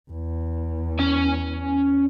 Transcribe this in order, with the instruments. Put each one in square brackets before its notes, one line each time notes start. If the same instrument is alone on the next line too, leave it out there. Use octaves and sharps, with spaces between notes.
[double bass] E2
[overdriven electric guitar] C#4 G#5